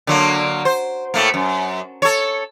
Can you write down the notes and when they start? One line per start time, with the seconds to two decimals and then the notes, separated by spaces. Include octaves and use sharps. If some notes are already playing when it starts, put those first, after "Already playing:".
0.07 D3 F#3 A#3
0.65 C5
1.14 A2 A3 A#3
1.34 F#2
2.02 A4 C#5